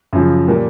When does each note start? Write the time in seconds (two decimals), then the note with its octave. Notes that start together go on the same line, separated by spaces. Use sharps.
0.13 F#2 C#3 F3
0.48 A#2 G3 A#3